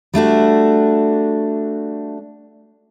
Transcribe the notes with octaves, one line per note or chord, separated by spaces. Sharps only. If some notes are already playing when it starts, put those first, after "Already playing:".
G3 A3 D4 F#4